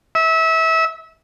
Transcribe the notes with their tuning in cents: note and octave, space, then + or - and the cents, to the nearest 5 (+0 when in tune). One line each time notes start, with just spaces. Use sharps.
E5 -25